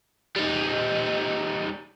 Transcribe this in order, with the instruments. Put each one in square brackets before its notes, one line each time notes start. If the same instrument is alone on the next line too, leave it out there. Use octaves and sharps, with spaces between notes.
[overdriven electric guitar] G3 D#4